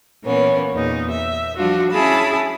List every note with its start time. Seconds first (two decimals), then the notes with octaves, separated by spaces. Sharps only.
0.23 A#2 E3 A#3 B3 C#4
0.73 E2 A#2 D#4
1.11 E5
1.56 F3 G3 D4 F4 F#4
1.91 C#4 E4 G#4 A5 B5